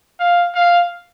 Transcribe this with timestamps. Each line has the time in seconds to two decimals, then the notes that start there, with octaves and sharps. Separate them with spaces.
0.20 F5
0.55 F5